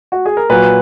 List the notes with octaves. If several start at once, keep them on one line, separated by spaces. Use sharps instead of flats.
F#4
G#4
A#4
A#2 F#3 B4